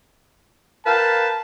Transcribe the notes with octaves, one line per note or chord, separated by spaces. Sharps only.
A#4 B4 F5 G5 A5